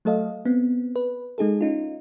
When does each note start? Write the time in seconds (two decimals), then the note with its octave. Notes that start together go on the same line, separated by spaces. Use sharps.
0.05 F#3 A3 A4 D#5 F5
0.45 B3 C4
0.96 B4
1.38 G#3 D#4 G#4 A4
1.61 C#4 D#4 F4